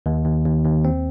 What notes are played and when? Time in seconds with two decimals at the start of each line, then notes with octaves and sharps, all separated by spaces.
0.06 D#2
0.25 D#2
0.46 D#2
0.64 D#2
0.85 C4